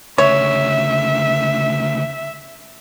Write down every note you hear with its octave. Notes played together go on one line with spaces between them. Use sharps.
D2 C#3 C#5 E5